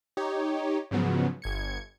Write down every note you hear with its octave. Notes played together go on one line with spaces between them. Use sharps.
D#4 G4 C#5
G#2 C#3 F3 F#3 B3
G1 G#6 C#7